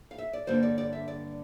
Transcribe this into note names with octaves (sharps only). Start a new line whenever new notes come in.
F5
E5
D5
G2 D3 G3 A#3 C5
D5
D5
E5
D5